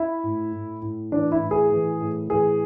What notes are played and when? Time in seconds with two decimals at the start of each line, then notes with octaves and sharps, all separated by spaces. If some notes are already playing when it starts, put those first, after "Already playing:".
Already playing: E4
0.23 A2
0.52 A2
0.82 A2
1.12 E3 D4
1.32 E4
1.41 A2
1.51 G#4
1.71 E3
2.00 A2
2.29 E3 G#4